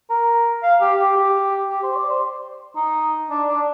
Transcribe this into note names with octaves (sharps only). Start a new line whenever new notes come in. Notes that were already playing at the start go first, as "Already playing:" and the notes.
A#4
F5
G4
G4
G4
G4
C5
D5
C5
D#4
D4
D4